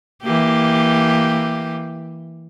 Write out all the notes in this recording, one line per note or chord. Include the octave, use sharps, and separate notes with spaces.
E3 A#3 G4